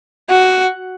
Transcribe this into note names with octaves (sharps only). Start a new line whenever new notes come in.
F#4